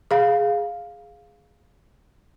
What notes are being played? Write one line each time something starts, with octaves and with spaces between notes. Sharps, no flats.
G#4 F5